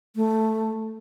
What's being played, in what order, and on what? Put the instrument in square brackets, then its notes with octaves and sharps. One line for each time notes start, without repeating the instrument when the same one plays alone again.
[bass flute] A3